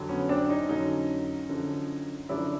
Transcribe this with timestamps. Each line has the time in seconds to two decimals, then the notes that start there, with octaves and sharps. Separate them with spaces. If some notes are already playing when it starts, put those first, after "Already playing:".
Already playing: F2 D3 F#3
0.09 B3 C#4
0.29 C4 D4
0.49 C#4 D#4
0.69 F2 D3 F#3 C#4 D#4
1.49 F#2 D3 F3
2.29 F#2 D3 F3 D4 E4